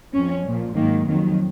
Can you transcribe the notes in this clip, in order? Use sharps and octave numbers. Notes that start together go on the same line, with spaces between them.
F2 F3 C#4
A#2 F3
G#2 D#3 F#3 A#3
F2 D#3 F#3 G#3